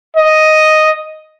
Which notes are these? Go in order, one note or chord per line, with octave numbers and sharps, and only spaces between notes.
D#5